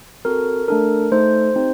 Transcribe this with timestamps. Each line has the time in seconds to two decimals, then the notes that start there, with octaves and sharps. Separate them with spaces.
0.25 C4 F#4 A4 A#4
0.68 A3 D4 A4 A#4
1.12 A3 D#4 A4 C5
1.56 C4 D#4 G4